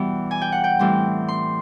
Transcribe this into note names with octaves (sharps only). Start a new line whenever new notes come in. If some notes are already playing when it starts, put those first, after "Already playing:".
Already playing: B2 E3 G3 B3
G#5
G5
F#5
G5
A2 E3 G3 C4
C6